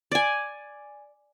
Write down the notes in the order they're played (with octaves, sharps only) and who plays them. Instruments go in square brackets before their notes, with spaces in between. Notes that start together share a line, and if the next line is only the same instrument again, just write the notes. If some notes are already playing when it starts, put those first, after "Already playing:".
[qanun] D5 G#5